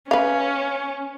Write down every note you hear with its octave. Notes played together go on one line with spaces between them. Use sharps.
C#4 B4 F5